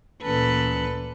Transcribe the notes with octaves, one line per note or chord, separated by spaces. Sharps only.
D2 A#2 E3 C#4 A4 B4